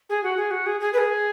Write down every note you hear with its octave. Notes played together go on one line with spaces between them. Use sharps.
G#4
F#4
G#4
F#4
G#4
G#4
B4
G#4